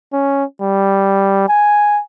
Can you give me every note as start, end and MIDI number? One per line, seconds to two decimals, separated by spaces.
0.13 0.44 61
0.62 1.48 55
1.49 2.01 80